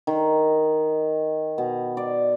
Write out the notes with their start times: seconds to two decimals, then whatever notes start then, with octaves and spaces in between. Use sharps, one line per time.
0.07 D#3
1.58 B2
1.97 D5